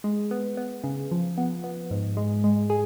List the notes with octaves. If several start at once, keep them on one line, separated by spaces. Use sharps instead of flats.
G#3
B3
B3
C#3
F3
B3
B3
G#2
G#3
G#3
G#4